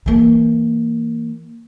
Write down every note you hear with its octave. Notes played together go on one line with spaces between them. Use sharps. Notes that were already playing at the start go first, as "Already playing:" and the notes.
E3 A#3